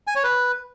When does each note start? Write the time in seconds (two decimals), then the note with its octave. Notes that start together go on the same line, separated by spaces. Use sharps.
0.07 G#5
0.15 C#5
0.23 B4